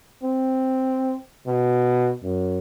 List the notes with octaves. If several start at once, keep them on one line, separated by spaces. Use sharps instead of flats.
C4
B2
F#2